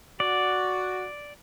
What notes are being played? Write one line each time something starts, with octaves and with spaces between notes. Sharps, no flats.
F#4 D5